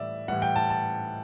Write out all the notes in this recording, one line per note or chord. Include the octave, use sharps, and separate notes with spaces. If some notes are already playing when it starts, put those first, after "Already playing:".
Already playing: A2 E3 G3 D5 E5
A2 E3 G3 F#5
G5
A5
A5